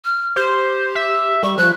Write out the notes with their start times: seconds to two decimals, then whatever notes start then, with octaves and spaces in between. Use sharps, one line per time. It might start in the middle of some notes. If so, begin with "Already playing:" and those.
0.05 F6
0.36 G4 C5
0.95 E5
1.43 G3 C#6
1.57 F3 F#6